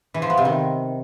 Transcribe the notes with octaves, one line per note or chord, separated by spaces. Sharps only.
E3
F3
B3
C3
D#3